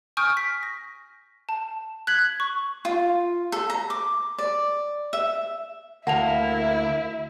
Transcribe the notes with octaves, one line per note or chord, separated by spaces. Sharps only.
G#5 C#6 D#6 F6 G6 D7
B6
A#6
A5
F#6 G#6 B6 F#7
C#6
F4
A4
A#5
D6
D5
E5
D2 A#3 E4 F#5 A5 F7